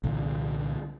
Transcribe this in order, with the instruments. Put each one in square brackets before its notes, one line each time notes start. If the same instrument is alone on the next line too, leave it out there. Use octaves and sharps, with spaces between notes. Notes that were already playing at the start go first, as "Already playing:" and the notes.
[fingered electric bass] C2 A#2 D3 E3